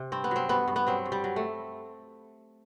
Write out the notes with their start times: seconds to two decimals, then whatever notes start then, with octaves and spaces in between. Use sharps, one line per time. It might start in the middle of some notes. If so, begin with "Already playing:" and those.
Already playing: C3
0.12 G2 C4
0.24 B3
0.31 F#3 C4
0.49 G2 B3
0.68 G2
0.76 B3
0.87 F#3 C4
1.06 G2
1.12 G3
1.24 F#3
1.36 A3